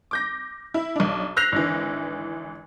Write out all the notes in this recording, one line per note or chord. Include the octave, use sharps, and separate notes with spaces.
D6 G6 A#6
E4
B1 D4
E6 F#6 G6 A#6 C7 F7
G#1 D3 E3